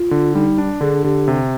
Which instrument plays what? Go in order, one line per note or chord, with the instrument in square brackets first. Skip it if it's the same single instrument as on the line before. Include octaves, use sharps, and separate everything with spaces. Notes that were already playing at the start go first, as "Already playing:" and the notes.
Already playing: [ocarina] F4
[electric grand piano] D3
[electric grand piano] G3 [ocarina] D#4
[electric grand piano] D4
[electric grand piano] D3 [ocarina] G#4
[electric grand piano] D3 [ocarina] G4
[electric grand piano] C3